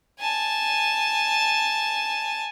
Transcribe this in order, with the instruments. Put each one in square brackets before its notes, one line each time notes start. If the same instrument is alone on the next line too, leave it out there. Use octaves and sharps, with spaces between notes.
[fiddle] G#5 A5